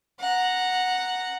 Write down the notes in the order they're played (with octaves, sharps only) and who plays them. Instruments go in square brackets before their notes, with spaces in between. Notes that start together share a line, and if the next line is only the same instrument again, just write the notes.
[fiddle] F#5 A#5